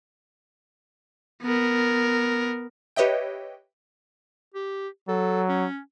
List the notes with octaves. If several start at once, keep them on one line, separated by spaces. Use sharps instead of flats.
B3 A#4
G4 B4 C#5 D#5 E5 G5
G4
F#3 A4
C#4